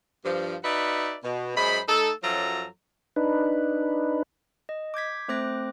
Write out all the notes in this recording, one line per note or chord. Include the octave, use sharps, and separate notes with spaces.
G2 F3
D#4 F#4 B4 D5 E5
B2
F#2 G#3 C5 B5
A3 D#4 A4
F#2 F3 F#3 A4 A#5
D4 D#4 B4
D#5
D6 G6 G#6 B6
A3 C4 C5 D6 F#6 A#6